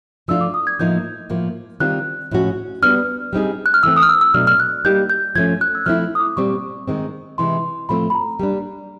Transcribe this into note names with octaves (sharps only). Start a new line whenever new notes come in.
F3 A3 D4 F4 E6
D6
D#6
G#6
A2 F3 A#3 D#4 G6
A2 F3 A#3
D#3 G3 C4 F4 F#6
A2 F3 G#3 C#4 F#4
G3 B3 D4 F6
G3 C4 D#4 G#4
F#6
F6
E3 A3 C4 E6
D#6
F6
E6
E6
B2 F#3 A3 D4 F6
F6
F#6
G3 A#3 D#4 G4 G6
G6
F3 A3 C#4 G#6
F#6
E6
F3 A3 C4 E4 F6
D#6
D6
A#2 G3 C4 C#6
D#3 G#3 C4
C3 E3 G#3 C6
A2 F3 A3 C4 F4 B5
B5
A#5
G3 A#3 D4